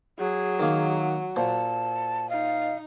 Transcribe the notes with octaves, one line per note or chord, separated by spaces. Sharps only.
F#3 G#4
D#3 A#3
A#2 C5 A5
D#4 F5